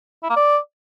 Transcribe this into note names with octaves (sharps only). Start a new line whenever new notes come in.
E4
A#3
D5